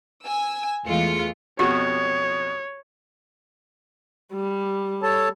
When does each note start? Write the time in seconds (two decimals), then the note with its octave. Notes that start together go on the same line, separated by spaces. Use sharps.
0.25 G#5 E6
0.85 E2 E3 G#3 A3 F4 C#7
1.59 F2 B2 F#4 G4 C#5
4.33 G3
5.03 A4 C#5 A5